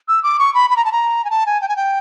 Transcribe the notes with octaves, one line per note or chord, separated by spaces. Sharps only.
E6
D6
C#6
B5
B5
A#5
A5
A#5
G#5
A5
G#5
G5
G#5
G5